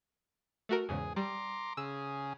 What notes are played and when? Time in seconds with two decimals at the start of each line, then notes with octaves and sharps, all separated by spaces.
0.69 A3 F#4 A#4
0.89 E2 G#2 C#3 G#4
1.16 G3 A#5 C6 D6
1.77 C#3 G#4 E6